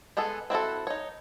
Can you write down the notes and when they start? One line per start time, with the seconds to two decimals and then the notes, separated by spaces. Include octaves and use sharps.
0.17 G#3 B3 G#4 A4
0.50 C4 E4 F#4 A4
0.87 D#4 C#5